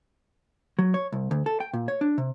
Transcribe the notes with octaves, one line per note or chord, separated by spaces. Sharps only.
F#3
C#5
C2
D2
A4
G5
A#2
C#5
D4
C3